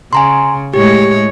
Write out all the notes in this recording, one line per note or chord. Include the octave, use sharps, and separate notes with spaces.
C#3 G#5 A#5 C6
A2 G#3 G4 C#5